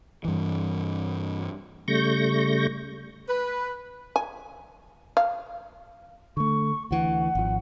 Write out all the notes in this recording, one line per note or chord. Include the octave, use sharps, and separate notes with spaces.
G2 E3
C#3 G3 A3 C#6 G6 A#6
B4
G#5
F5
D3 A3 C#6
D2 E3 F#5
G#1 F3